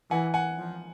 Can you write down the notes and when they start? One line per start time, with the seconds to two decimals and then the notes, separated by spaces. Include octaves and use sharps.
0.10 E3 F#5 G#5
0.34 F#5 G#5
0.58 F3